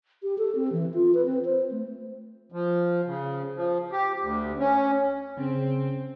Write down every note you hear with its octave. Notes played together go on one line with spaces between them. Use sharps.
G4
A4
C4
E3
F4
B4
C4
C5
A3
F3
C#3
F3
G4
D2
C#4
C#3 C4